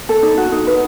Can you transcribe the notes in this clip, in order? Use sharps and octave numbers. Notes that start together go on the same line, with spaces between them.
A4
D#4
F#4
D#4
B4